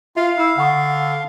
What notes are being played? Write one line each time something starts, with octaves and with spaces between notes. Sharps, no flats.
F4 E5 F5
E4 E6 F6
D3 F#5 C#6 D#6